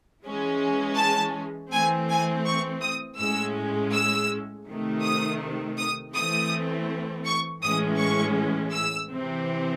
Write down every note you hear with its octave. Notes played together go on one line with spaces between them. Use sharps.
E3 G#3 C#4
A5
E3 A3 C4 G#5
G#5
C#6
D#6
A2 G#3 C#4 E6
E6
C3 D#3 A3
D#6
D#6
E3 A3 C4 D#6
C#6
A2 E3 G#3 C#4 D#6
C#6
E6
C3 E3 C4